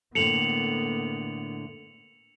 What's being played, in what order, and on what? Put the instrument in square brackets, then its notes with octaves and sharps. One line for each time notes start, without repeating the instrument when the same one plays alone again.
[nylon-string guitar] A2 D3 A4 [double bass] A#3 B3 [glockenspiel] C#7 F7 F#7